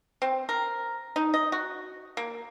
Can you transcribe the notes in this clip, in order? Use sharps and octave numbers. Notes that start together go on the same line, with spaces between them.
C4
A#4
D#4
D#5
F#4
A#3